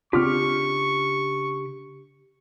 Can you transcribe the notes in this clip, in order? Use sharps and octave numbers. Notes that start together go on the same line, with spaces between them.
C#3 C4 D4 F4 G4 C#6 D6 F6